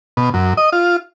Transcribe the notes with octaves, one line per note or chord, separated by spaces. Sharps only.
B2
F#2
D#5
F4